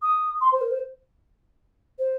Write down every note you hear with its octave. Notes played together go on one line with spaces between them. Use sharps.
D#6
C6
C5
A#4
C5
C5